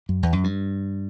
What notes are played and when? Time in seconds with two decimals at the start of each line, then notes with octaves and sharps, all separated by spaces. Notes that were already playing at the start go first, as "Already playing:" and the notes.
0.09 F#2
0.23 E2
0.33 F#2
0.44 G2